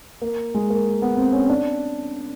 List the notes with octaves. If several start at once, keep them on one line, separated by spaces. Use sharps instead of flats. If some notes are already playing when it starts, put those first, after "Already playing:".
A#3
G#3
A#3
B3
C4
C#4
D4